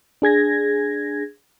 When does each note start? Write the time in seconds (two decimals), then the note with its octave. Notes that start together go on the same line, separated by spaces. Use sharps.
0.22 D4 G#4 G#6 A#6